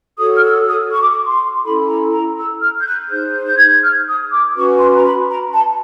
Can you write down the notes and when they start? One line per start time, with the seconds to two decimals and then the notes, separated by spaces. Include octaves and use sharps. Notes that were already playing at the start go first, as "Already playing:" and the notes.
0.18 F#4 A4 C#5 D#6
0.36 F6
0.42 E6
0.66 D#6
0.91 C#6
0.99 D6
1.08 C#6
1.27 C6
1.63 C#4 E4 A4 B5
1.88 A#5
2.12 A#5
2.36 E6
2.61 F6
2.80 G6
2.85 F#6
3.09 D#4 G#4 C5 G6
3.46 G6
3.57 G#6
3.68 G6
3.82 F6
4.07 D#6
4.31 D6
4.55 C#4 F#4 B4 C#6
4.79 C6
4.95 A#5
5.04 B5
5.28 A#5
5.52 A5